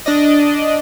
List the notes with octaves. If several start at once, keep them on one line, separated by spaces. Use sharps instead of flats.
D4 D5 D#5